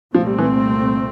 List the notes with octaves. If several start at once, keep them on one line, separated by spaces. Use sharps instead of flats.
C2 A#2 F3 A3 C4
G3
E3